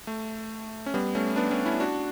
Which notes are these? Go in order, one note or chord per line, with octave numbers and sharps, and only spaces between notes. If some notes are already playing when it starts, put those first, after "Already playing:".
A3
C#4
G3 B3
A3 C#4
B3 D4
A3 C#4
C#4 E4
D4 F#4